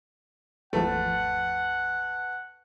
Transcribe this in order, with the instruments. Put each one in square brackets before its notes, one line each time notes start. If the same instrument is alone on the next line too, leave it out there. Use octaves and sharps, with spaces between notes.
[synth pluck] G#1 E2 F3 [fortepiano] A3 [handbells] B4 A5 [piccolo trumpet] F#5